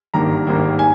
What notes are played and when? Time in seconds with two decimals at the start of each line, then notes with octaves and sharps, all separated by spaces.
0.14 G#1 G2 D#3 A#3 A#5
0.47 G#1 G2 D#3 A#3
0.79 G#5